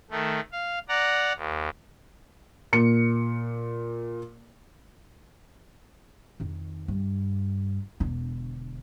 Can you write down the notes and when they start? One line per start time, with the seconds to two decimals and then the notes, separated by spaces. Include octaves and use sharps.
0.11 D#3 A3
0.52 F5
0.89 D5 F#5 A#5
1.35 D#2
2.73 A#2 C#7
6.40 F2 D#3
6.88 G2
8.00 E1 D3